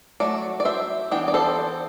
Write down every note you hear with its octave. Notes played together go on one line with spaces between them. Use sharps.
F#3 A3 D5
D5
C5 E5
E3 B3 D4 G5
D5
A4 C5